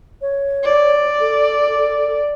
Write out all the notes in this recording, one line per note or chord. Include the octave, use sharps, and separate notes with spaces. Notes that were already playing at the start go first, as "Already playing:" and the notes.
C#5
D5
A4